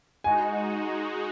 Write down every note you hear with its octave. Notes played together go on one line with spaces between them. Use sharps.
G#3 D#4 F#4 G#5